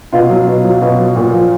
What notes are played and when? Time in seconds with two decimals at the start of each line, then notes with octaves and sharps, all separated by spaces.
0.13 B2 F4
0.30 F#3
0.47 B2
0.64 F#3
0.81 B2
1.00 F#3
1.16 A#2
1.33 F3